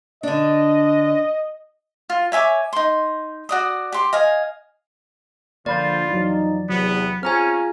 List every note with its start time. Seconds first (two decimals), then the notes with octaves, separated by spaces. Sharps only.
0.23 D3 D4 D#5
2.10 F4
2.32 C#5 E5 G#5 D6
2.73 D#4 C6
3.49 F#4 D5 D#6
3.92 G4 C6
4.13 D#5 F5 G#5
5.66 D3 F3 A#3 F4 D5 B5 G6
6.09 F2 E3 F#3 D#4
6.70 E2 C3 F#3 B3
7.23 C4 C#4 F4 G#4 G#5 A#5 F6